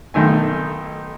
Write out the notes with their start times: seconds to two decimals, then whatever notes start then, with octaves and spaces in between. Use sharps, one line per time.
0.14 B1 D#3 A3 G#5